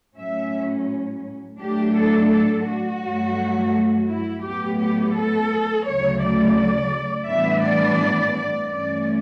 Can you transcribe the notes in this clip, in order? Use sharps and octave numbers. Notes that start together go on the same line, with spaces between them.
A2 F#3 C#4 E5
A2 F#3 A3 D4 G4
A4
A4
F#4
G2 F#3 A3
E4
A2 F#3 B3 G4
G4
A4
D2 C#3 F#3 A3 C#5
D5
A2 E3 G3 B3 D4 E5
D5
D5
G2 E3 A3 C#4 D5